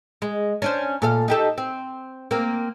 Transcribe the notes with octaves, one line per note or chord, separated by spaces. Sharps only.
G#3
C#4 D4 C5
A#2 A4 F5
D#4 G4 A4
C4
A#3 C4